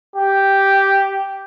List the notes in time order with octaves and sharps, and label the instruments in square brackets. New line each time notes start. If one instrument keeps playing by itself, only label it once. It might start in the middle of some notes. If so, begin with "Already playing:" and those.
[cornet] G4